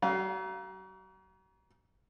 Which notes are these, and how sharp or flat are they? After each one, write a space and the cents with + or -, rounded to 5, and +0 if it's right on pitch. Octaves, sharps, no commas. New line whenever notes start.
F#3 +40 F5 +0